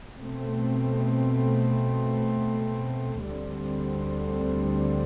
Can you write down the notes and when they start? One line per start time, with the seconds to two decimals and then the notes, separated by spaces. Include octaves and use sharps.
0.18 B2 A3 C4
3.26 D2 D3 G3 C4